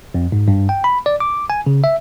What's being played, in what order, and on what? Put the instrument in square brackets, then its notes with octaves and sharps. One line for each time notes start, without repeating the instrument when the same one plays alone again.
[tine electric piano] F2
G#2
G2
G5
B5
D5
D6
G#5
C#3
E5